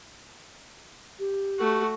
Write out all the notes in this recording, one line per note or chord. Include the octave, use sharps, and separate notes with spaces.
G4
A3 F#4